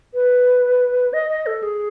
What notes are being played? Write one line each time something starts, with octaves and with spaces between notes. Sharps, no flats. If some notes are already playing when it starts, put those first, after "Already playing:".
B4
D#5
D#5
A4
G#4